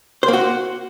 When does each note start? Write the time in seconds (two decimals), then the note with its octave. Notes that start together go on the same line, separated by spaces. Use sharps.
0.23 C5
0.28 A#3
0.33 F#4